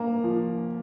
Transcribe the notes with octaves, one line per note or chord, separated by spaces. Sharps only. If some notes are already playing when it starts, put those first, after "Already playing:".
Already playing: A#3 A#5
F3